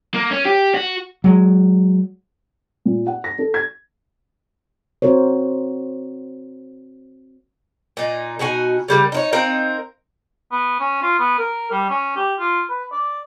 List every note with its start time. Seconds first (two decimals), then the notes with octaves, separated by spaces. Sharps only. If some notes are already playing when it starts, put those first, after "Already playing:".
0.14 A#3
0.31 C#4
0.45 G4
0.75 F#4
1.24 F#3 G#3
2.85 A#2
3.07 F#5
3.24 A#6
3.39 A4
3.54 G#6
5.02 C4 F#4 A#4 C5 C#5
7.97 A#2 D#4
8.39 B2 D#4 F#4 G#5
8.88 C#3 G3 A#3
9.12 D#4 E4 C#5
9.32 C4 D#4 A#4 F5
10.51 B3
10.79 C#4
11.02 F4
11.19 B3
11.38 A#4
11.71 G3
11.90 C#4
12.16 G4
12.39 F4
12.69 B4
12.92 D5